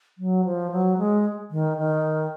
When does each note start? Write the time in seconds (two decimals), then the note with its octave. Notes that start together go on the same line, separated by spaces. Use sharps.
0.18 F#3
0.45 F3
0.72 F#3
0.98 G#3
1.51 D#3
1.78 D#3